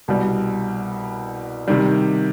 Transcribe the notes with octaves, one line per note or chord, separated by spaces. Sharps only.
C2 B2 G3
C3 D#3 G3